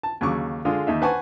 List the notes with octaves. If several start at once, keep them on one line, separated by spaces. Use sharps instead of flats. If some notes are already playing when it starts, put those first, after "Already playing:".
A5
D#2 C#3 F#3 C#6 D6
D3 G#3 F4 G#4
D#2 D#4 E5
B4 C5 F#5 G#5 A5 C#6